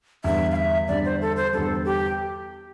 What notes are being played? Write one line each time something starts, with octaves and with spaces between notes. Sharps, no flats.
E2 D3 G3 E5
F5
E5
E2 D3 G3 D5
C5
A4
C5
E2 D3 G3 A4
G4